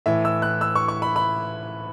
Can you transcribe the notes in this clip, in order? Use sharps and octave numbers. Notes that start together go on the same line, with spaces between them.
A2 E3 E5
E6
F#6
E6
C#6
C#6
B5
B5